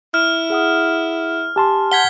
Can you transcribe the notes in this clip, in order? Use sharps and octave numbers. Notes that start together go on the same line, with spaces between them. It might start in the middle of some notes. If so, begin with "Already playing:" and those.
E4 F6
G#4 F#5 D#6
G4 G#5 A5 C6
F#5 G6 G#6 B6 G7